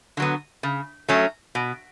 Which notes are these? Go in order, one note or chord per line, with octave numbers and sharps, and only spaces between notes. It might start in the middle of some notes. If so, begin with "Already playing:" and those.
D3 F#3 B3
C#3
F#3 A3 C#4
B2